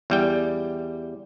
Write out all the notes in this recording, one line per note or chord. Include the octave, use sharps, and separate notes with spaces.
E2 G3 G5